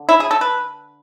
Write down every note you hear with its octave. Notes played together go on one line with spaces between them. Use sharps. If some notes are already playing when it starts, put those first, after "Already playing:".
Already playing: D3
E4
G#4
A4
B4